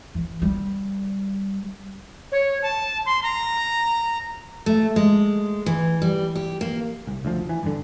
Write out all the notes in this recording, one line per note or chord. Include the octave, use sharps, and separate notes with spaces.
E3
G3
C#5
A5
C6
A#5
A3
G#3
E3
G3
G4
A#3
C2
D2 F3
E3
G2 D3